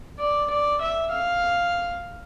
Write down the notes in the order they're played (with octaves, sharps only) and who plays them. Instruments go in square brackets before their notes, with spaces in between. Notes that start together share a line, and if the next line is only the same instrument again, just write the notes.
[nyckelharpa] D5
D5
E5
F5